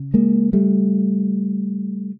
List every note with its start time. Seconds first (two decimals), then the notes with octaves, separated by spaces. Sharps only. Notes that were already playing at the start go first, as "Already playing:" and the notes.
Already playing: C#3
0.14 G#3 A#3
0.53 G3 A3